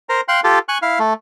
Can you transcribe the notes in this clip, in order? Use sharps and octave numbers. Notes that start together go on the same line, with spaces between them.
A#4 C5 A#5
F5 G5 C6 F#6
F4 G4 A4
G#5 C#6 F#6
E4 F5
A3